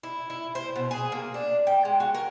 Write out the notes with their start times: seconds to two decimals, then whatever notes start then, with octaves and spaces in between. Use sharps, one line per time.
0.03 E4
0.30 E4
0.55 C5
0.76 B2
0.91 G#4
1.12 A#3
1.34 D4
1.67 G5
1.85 G#3
2.00 F#4
2.14 A#4